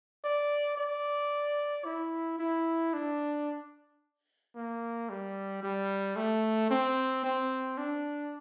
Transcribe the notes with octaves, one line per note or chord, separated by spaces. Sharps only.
D5
D5
E4
E4
D4
A#3
G3
G3
A3
C4
C4
D4